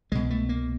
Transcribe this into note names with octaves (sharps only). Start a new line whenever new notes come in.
C2 B2 G#3
A3
A#3